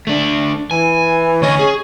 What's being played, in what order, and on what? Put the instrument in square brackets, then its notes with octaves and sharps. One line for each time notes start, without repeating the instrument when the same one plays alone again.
[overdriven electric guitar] A3 D4
[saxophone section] E3 [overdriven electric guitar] G#5
[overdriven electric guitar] D2 D#5 [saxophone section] C#4
[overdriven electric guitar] G#4